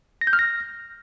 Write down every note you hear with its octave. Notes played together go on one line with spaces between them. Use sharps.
A#6
G6
F6
A#6